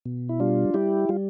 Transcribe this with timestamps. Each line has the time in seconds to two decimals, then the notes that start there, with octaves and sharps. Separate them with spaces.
0.06 B2
0.29 E4
0.40 G3 D4 F4
0.74 G3 E4 G4
1.09 G3 F4